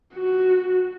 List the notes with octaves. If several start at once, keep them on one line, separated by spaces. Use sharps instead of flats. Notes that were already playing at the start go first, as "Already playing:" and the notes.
F#4